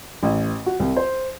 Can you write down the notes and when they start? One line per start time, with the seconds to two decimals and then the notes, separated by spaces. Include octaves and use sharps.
0.23 A1
0.66 F#4
0.80 C2
0.97 C5